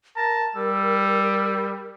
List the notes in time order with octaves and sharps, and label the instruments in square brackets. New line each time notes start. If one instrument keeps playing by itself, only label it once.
[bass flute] A#4 [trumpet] A5 [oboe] A#5
[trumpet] G3 [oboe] E6